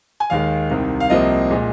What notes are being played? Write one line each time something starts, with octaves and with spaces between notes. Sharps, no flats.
G#5
D#2 D#3 G#3 F5
C2 C3 D#3
F5
C2 C3 F3 A#3 D#5
A#2 G#3